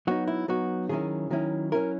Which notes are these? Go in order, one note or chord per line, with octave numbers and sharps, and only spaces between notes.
F#3 B3 D#4 F#4
E4
F#3 B3 D#4 F#4
D#3 F#3 C#4 E4 G#4
D#3 F#3 C#4 E4
F#3 C#4 E4 A#4